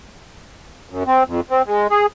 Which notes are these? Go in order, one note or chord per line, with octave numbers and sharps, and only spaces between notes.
F#2
C4
F2
C4
G#3
G#4